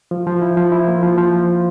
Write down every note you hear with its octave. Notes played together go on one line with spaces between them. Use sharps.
F3
F3
E4
F3
E4
A#3
F3
F3